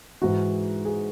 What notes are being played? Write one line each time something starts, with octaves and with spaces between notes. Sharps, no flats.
G#2 E3 F#4
G#4